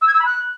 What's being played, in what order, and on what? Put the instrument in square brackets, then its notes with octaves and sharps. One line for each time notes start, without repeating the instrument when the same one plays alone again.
[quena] E6
G#6
E6
B5
F#6